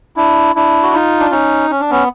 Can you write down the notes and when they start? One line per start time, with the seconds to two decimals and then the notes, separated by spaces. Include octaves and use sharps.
0.17 D4 E4
0.56 D4 E4
0.83 F#4
0.93 D#4 F4
1.20 D4
1.31 C#4 D#4
1.70 C#4
1.80 D4
1.90 B3 C#4